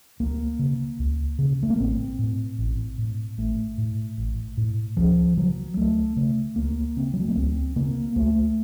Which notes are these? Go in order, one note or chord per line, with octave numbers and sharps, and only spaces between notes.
C#2 A#3
C#3
C#2
C#3
A3
A#3
A1 C4
A2
A1
A2
A1 A3
A2
A1
A2
C#2 F3
C#3 F#3
C#2 A3
C#3 A3
C#2 A#3
C#3 C4
F#3
A3
A#3
C#2 C4
C#3 A#3
C#2 A3